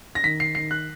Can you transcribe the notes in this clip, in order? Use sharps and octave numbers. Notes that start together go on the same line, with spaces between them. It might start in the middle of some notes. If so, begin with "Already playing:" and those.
A#6
D#3 B6
C7
D#3 C7
F#6